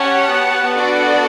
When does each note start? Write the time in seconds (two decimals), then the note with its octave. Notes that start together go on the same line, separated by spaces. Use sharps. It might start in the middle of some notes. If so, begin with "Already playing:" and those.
Already playing: C#4 G4 C#5 F#5 A5
0.29 B3
0.41 B3
0.51 B3
0.64 B3
0.74 D4 F#4 A4 D5 F#5